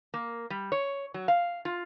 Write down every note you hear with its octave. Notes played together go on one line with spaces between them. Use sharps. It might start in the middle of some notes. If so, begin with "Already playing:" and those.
A#3
G3
C#5
F#3
F5
F4